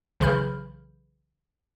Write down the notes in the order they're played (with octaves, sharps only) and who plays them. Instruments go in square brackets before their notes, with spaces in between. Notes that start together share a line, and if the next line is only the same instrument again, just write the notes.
[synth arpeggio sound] B1 C#3 E3 B5 F6 G6